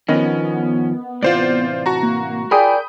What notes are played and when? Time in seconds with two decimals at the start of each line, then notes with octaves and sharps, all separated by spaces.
0.08 D#3 F3 B3 C#4 A#4 B4 D#5
1.23 A2 C3 E3 F4 C5 D5
1.86 F#4 A5 A#5
2.03 A#3
2.51 F4 G#4 A#4 D5 G5 B5 D#6 G6